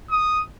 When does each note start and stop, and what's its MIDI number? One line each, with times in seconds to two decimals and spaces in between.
0.11 0.42 87